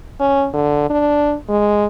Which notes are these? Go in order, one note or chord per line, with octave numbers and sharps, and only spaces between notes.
C#4
D3
D4
G#3